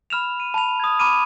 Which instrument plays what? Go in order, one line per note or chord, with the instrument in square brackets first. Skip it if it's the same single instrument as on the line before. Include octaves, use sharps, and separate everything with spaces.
[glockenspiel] B5 F6 E7 F7
D#7
A5 B5 F7
D#6 G#6
A#5 B5 D6 F6 D#7 E7